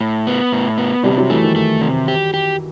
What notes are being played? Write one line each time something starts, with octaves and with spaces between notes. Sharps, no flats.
A2
B3
A2
B3
C3 G3
F#3
E3 A3
D#3
A3
C3
G4
G4